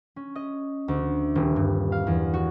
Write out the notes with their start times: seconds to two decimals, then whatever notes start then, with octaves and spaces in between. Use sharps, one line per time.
0.16 C#4
0.35 D#5
0.88 D2
1.35 D#1
1.56 G2
1.92 F5
2.07 E2
2.34 F#4